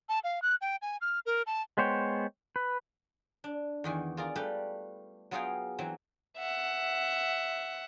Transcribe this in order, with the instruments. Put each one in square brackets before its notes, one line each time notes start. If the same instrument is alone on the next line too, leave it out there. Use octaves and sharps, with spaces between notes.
[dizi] A5
F5
F#6
G5
G#5
F6
A#4
A5
[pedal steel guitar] G#3 B3 C5 C#5 G5
B4
[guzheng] D4
E2 D#3 E3
F4 G#4 A#4 D5
G3 A3 G4 B4
F#3 B3 F4 G#4 F5 G5
E3 F#3 C4
[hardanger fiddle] E5 F#5